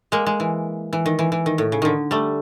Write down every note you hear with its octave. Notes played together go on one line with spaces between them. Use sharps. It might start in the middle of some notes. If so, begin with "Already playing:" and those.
G#3 A#3
G#3
E3
E3
D#3
E3
E3
D#3
A2
C#3
D3 D#3
G3 A3